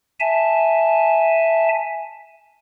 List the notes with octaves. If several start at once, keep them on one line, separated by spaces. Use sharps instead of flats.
E5 G#5 A5